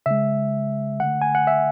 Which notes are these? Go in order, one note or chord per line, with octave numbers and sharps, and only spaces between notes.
C#3 G#3 E5
D3 A3 F#5
G#5
F#5
E5